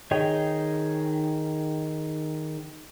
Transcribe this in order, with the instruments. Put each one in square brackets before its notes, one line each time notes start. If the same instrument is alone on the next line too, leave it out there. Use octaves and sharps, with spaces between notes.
[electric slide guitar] D#3 G#4 C#5 D#5 G5